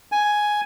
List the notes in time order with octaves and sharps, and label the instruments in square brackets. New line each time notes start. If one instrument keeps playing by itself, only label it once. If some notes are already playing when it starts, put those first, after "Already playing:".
[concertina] G#5